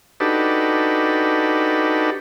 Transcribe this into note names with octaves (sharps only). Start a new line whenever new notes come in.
D4 D#4 F#4 G4 A4 B4